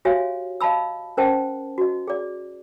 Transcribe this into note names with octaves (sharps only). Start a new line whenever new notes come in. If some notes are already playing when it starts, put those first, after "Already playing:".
F#4 G4 C#5 E5 F5 G#5
D#5 F5 A5 B5 E6
C#4 A#4 C5 F#5 G5 A5
F#4 D#5
G#4 D5